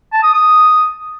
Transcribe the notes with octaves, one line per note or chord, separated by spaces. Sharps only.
A5
D#6
D#6